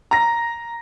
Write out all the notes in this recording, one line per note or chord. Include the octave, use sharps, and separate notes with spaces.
A#5 A#6